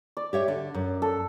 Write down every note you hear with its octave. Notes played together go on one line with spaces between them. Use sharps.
D5
G4 C#5 E5
D3
F#2
A4